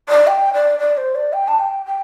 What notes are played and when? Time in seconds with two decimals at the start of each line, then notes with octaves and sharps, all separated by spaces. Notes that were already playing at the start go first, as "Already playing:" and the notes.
0.09 D5
0.27 G5
0.54 D5
0.79 D5
0.97 C5
1.15 D5
1.33 G5
1.48 A5
1.59 G5
1.86 G5